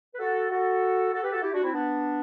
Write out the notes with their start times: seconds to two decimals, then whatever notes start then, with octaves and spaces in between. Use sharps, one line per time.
0.13 B4
0.19 F#4 A4
0.50 F#4 A4
1.12 F#4 A4
1.21 G4 B4
1.32 F#4 A4
1.41 E4 G4
1.52 D4 F#4
1.62 C4 E4
1.72 B3 D4